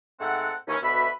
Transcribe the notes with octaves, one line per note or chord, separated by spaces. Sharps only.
G#2 A3 C4 A4 F#5
D#2 E3 C#4
D2 B2 B4 E5 B5